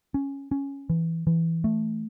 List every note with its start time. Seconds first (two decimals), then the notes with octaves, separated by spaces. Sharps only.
0.14 C#4
0.51 C#4
0.90 E3
1.27 E3
1.64 A3